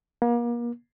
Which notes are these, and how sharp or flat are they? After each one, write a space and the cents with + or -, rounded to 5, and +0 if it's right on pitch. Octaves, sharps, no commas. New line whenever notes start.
A#3 +35